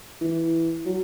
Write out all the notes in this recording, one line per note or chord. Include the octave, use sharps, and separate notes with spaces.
E3
F#3